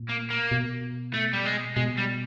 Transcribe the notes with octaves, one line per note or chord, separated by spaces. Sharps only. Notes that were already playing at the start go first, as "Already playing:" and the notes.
Already playing: A#2
A#3
A#3
B2
A3
G3
G#3
B2 G#3
G3